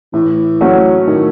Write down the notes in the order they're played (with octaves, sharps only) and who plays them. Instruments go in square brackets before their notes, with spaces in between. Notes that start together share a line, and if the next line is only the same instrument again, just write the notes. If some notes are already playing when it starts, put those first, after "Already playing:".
[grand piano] A2 [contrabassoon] E3
[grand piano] F#3 A3 C#4 F#4
[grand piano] A2 [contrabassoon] D#3